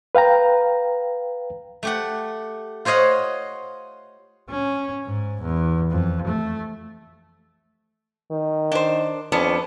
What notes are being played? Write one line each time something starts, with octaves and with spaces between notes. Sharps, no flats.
B4 F5 G5 A#5
A3 G4 F#5
F4 C5 C#5 D#5 F5 F#5
C#4
G#2
E2
F2
A3
D#3
D4 C5
F2 B3 C#4 D4